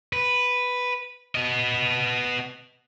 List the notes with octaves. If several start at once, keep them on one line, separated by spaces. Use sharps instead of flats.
B4
B3 D#5